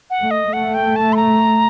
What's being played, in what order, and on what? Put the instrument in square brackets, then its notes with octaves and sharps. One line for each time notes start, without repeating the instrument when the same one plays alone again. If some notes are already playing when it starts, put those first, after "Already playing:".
[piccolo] F#5
[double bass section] A3
[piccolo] D#5
[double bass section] A3 [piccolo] F#5
[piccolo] G5
A5
C6
A#5